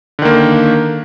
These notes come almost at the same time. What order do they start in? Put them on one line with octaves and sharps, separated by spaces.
D3 D#3 A#3